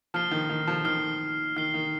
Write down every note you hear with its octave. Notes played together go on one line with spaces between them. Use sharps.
F3 F6 C7 G7
D#3
D#3
F3
D#3 F6 C7 G7
D#3 F6 C7 G7
D#3